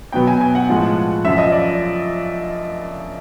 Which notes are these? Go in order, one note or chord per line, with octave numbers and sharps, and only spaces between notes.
B2 F#3 B3 G5
G#5
G#5
F#5
A2 F3 G#3
F#2 C#3 F3 E5
D#5
D5